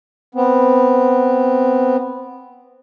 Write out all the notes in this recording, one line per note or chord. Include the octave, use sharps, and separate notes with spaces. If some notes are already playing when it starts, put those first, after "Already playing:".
B3 C4